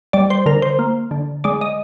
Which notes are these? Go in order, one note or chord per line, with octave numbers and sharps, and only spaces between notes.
G3 D5
C5
D3 A#4
C5
A#3
D3
G#3 D5
D#5